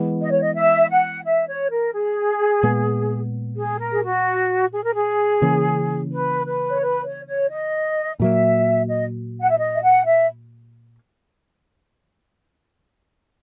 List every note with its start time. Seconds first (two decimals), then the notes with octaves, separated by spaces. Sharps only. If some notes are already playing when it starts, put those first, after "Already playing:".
Already playing: E3 G#3 B3
0.21 D#5
0.32 C#5
0.42 D#5
0.55 E5
0.90 F#5
1.25 E5
1.48 C#5
1.71 A#4
1.94 G#4
2.63 A#2 G#3 B3
3.56 G#4
3.79 A#4
3.92 G#4
4.03 F#4
4.72 G#4
4.83 A#4
4.94 G#4
5.42 C#3 E3 A#3 C#4
6.11 B4
6.46 B4
6.70 C#5
6.81 B4
7.04 C#5
7.27 C#5
7.50 D#5
8.20 A#2 F#3 A#3 E5
8.89 D#5
9.42 F#5
9.50 E5
9.59 D#5
9.74 E5
9.82 F#5
10.05 E5